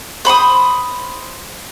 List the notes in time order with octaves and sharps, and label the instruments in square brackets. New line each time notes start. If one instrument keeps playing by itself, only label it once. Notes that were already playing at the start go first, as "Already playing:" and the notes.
[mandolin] C5 B5 C#6 D#6